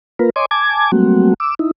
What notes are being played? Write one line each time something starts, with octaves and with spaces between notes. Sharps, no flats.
A#3 F4 A#4 B4
C#5 D#5 G#5 C6 D6
G#5 A5 D6 G#6
F#3 G3 A3 A#3 C4 F#4
D6 E6
D#4 E4